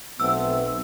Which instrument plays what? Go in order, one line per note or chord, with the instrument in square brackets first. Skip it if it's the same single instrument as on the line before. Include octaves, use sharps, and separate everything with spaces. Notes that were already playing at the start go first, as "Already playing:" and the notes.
[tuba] B1 [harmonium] A3 B3 C4 [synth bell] E6